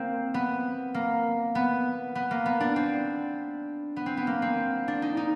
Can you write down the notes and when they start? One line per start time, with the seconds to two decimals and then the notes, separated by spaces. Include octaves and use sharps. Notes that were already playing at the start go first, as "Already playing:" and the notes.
Already playing: A#3 C4
0.34 B3
0.94 A#3
1.55 B3
2.15 B3
2.31 A#3
2.46 B3
2.60 D4
2.76 C4
3.96 B3
4.06 C4
4.17 B3
4.27 A#3
4.42 C4
4.88 D4
5.02 D#4
5.17 D#4